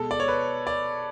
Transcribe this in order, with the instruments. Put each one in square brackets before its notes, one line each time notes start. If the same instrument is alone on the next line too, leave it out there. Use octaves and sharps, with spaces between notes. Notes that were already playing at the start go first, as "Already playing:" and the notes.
Already playing: [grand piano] B2 G#3 A4
D5
C#5
B4
D5